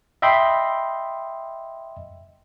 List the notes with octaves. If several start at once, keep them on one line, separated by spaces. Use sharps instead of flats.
D#5 E5 G5 B5 C6